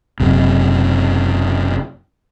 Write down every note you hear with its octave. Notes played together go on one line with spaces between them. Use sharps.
F#1 F#2 C3